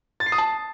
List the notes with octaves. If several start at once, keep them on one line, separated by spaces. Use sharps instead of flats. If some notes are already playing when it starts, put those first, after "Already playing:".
A6
C7
D#6
A5